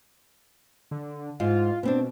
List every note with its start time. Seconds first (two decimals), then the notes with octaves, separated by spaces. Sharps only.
0.91 D3
1.40 G#2 F4
1.83 B2 B3 C4 D4